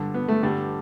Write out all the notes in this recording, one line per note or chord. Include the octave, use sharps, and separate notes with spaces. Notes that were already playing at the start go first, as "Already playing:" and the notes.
Already playing: G2 D3
B3
A3
G2 D3 G3